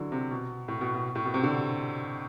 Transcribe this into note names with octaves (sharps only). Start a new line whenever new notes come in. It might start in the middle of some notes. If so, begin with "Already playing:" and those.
Already playing: D3 E3 F#3
C3
B2
A2
B2
B2
A2
B2
C3
D3